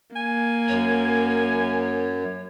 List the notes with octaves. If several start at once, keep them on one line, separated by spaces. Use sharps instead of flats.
A#3 G#5
F#2 C#5